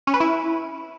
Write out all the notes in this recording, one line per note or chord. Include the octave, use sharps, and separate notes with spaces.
C#4
B4
E4